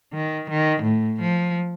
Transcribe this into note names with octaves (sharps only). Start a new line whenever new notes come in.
D#3
D#3
A2
F3